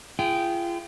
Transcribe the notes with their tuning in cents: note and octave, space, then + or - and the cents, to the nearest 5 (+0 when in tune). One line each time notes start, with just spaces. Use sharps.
F4 -40 G#4 +0 G5 -10